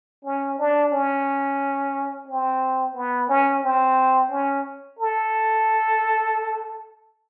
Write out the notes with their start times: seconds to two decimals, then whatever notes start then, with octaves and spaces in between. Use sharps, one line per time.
0.24 C#4
0.59 D4
0.92 C#4
2.27 C4
2.96 B3
3.29 C#4
3.63 C4
4.31 C#4
4.99 A4